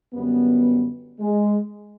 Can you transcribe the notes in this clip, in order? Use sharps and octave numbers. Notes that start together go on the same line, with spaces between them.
F#2 D3 G3 B3
G#3